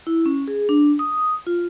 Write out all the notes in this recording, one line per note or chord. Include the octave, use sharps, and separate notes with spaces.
E4
C#4
G#4
D4
D#6
F4